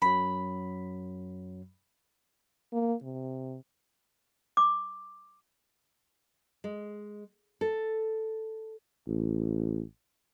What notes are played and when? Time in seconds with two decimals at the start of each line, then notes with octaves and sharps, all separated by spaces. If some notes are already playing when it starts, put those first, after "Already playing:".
0.02 F#2 F#3 B5
2.73 A#3
3.02 C3
4.57 D6
6.64 G#3
7.61 A4
9.08 A1